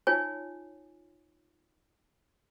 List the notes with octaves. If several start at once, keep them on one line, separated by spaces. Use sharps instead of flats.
D#4 F4 C#5 G#5